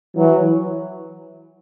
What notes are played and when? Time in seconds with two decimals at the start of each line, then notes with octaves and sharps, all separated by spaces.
0.16 E3 F#3